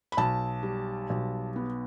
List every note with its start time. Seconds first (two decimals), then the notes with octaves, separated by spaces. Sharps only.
0.12 B5
0.17 B1 A5
0.63 G3
1.10 B1
1.56 B3